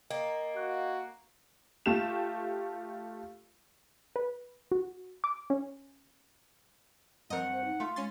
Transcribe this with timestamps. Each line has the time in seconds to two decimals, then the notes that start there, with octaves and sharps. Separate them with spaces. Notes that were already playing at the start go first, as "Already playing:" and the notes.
0.11 A#3 D#5 G5
0.56 F#4 F5 F#6
1.86 A3 F4 G4 E7
4.16 B4
4.71 F#4
5.24 D6
5.50 C#4
7.30 G2 F3 C4 A#4 D#5 F#5
7.52 C5
7.65 D#4
7.80 A3 F4
7.96 G#3 C#4 C6 A6